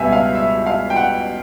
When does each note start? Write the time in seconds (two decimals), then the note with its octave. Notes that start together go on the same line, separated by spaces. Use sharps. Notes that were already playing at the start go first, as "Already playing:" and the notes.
Already playing: C#2 B2 G3 B3 E5 F#5 G#5
0.12 F5
0.35 E5
0.67 F5
0.90 G5
0.96 F#5